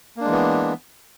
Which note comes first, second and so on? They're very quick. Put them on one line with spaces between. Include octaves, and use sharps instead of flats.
A#3 D4 G#3 E3 B3